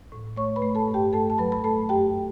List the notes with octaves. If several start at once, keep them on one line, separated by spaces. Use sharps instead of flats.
A2
A3 C#5 C#6
B4 B5
A3
A4 A5
G2
G4 G5
A3 A4 A5
A5
F#3 B4 B5
B5
A3 A4 A5
F#2 G4 G5